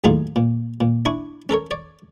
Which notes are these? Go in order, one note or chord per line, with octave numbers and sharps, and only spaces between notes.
D#2 A2 F#3 D#4 F4 G#4
A#2
A#2
D4 E4 G#5 C#6
C#4 A4 A#4 C#5
C#5 D5